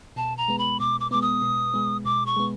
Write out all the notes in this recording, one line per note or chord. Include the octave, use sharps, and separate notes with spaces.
B2 A5
A#5
G#3 B3
B5
B2 D6
D6
G#3 B3 D6
D#6
B2
G#3 B3
B2 D6
C#6
G#3 B3